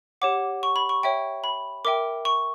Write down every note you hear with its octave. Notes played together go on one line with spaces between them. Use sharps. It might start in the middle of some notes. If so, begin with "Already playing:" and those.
G4 C#5 F#5 D6
C#6
B5
C#6
C#5 E5 G5
B5
A#4 E5 G5 D6
C#6